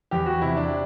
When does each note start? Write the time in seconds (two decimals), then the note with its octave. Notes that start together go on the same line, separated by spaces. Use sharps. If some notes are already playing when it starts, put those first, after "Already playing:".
0.11 E2 G4
0.26 F#4
0.42 C3 E4
0.57 D4